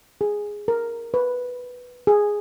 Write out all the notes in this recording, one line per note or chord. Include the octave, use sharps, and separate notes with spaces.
G#4
A#4
B4
G#4